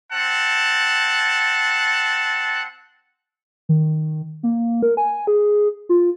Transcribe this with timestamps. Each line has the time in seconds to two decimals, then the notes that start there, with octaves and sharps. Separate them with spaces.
0.12 C4 F#5 A5
3.69 D#3
4.43 A#3
4.82 A#4
4.97 G#5
5.27 G#4
5.89 F4